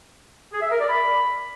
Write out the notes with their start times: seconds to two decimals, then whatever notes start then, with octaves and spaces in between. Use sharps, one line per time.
0.52 G#4
0.62 E5
0.71 A#4
0.80 D5
0.89 B5